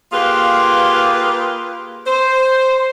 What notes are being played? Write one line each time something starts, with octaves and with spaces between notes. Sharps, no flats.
A#3 F4 G4 G#4 B4
C5